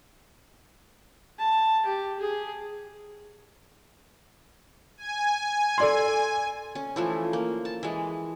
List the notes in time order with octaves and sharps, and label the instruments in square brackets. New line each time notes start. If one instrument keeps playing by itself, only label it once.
[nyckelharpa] A5
G4
G#4
[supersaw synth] G#5
[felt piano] A4 D5 C6
[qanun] C#4
E3 F3 A3
A#3
A5
E3 G#3